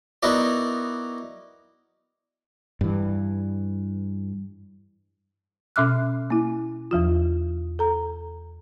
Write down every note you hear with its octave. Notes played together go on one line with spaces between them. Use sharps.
B3 D#4 E4 F#4 A#4 D5
G2 E3
B2 C#4 E5 D6 F6 F#6
A#3 E4
E2 F3 F4
A4 A#5